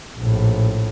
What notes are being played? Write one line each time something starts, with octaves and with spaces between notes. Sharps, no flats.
A#1 A2